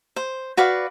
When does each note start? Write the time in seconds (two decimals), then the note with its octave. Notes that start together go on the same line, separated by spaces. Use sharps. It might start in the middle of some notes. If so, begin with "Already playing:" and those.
0.16 C5
0.57 F#4 B4 D5 F5